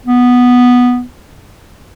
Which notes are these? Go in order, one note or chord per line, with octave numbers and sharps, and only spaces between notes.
B3